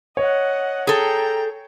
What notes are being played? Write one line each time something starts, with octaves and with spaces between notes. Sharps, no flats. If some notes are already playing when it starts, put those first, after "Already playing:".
C#5 D#5 F#5
G#4 A4 G5 A#5